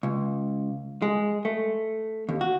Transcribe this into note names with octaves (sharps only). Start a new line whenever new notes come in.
C#2
G#3
A3
D#2
F#4